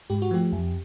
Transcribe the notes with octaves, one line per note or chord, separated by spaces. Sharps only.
G#2 G4
F#4
F3 A3 G4
F2